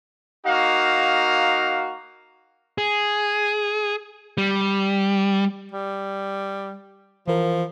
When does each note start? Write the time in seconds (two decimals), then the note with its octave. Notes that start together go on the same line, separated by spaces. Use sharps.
0.46 A#3 D#4 F#4 F5
2.78 G#4
4.38 G3
5.72 G3
7.28 E3 F3 A#4